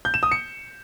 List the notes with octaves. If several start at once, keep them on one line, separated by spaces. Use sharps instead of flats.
G6
E7
D#6
C#7